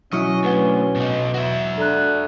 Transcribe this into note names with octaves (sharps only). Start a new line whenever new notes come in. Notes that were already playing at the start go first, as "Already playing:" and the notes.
B1 F#3 C#4 E4 D#5 C#6 F6 C#7
D2 B4 F#5 G7
B2 D#4
F#4 E5
D4 A4 A#5 F#6